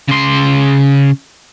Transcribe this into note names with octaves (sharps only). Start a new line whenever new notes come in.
C#3 C6